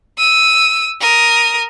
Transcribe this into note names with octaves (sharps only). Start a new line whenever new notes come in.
E6 D#7
A#4 D#6